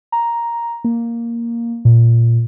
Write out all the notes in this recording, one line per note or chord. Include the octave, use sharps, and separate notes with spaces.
A#5
A#3
A#2